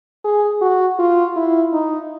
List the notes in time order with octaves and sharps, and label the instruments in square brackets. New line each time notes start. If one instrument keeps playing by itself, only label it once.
[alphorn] G#4
F#4
F4
E4
D#4